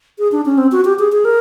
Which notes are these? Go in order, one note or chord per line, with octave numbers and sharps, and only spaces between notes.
G#4
D4
C#4
C4
F#4
G4
G#4
G#4
A#4